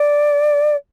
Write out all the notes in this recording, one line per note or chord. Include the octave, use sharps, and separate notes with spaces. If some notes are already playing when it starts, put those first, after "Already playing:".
Already playing: D5